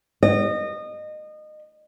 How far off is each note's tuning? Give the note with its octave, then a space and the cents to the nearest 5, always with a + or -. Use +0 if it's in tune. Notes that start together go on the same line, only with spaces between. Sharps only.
D#5 -25